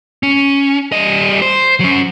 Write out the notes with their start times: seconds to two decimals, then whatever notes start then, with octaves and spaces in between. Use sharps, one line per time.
0.23 C#4
0.92 G3 D#5
1.42 C5
1.80 F#3 C#4